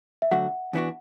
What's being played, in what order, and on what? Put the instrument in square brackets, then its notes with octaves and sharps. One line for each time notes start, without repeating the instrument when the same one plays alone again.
[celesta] E5
[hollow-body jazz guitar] D2 D3 F#3 A3 F#4 [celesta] F#5
[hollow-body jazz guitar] E2 E3 B3 D4 F#4